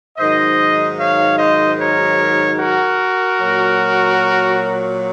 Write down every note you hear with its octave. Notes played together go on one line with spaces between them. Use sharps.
G#2 D#3 F#3 C5 D#5
C#5 F5
C5 D#5
A#4 C#5
F#4 A#4
A#2 F#3